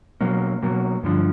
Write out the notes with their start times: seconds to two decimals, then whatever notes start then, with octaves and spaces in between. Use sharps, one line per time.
0.21 B2 F#3 A#3
0.62 B2 F#3 A#3
1.03 G2 D3 F3